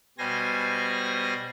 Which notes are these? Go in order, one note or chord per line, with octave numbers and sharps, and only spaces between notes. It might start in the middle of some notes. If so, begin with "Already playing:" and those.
B2 G3 C5 G#5 A#6